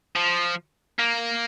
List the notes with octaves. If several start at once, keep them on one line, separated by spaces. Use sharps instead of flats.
F3
A#3